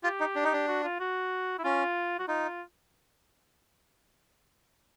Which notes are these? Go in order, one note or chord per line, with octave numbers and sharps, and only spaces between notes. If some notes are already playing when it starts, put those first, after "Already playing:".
F4 G4
D#4
D4
D#4
D4
F#4
F4
F#4
E4
C#4 F4
F#4
D#4 F4